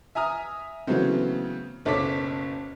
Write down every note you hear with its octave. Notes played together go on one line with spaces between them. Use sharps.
E5 G#5 A#5 D#6 F6
C#3 E3 F#3 A3 B3 C4
F#1 B1 A4 C#5 D6 B6